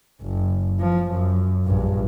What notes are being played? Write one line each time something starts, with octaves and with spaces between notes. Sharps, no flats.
F#1
F3
F#2
A#1 G2